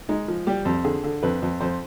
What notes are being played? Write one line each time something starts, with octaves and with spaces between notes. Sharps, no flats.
G#3 D#4
F3
G3 G4
F2
D3 G#4
D3
F2 B4
F2
F2 C5